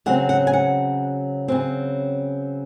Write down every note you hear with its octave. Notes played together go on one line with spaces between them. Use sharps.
C#3 F#3 C4 F#5
F#5
G#5
F#5
C#3 F#3 C4